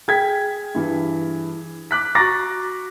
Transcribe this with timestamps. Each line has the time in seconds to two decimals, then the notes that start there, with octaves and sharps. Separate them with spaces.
0.08 G#4 G5 G#6 B6
0.75 G2 E3
1.91 D6 F#6 B6
2.15 F#4 A#5 C#6 D6 A6 A#6